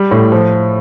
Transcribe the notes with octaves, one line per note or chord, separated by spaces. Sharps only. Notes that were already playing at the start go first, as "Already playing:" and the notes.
Already playing: G3
A2
F3